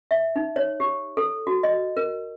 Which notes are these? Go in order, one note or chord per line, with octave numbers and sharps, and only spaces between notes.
E5
D#4
C#5
G4
A4
F#4
D#5
A#4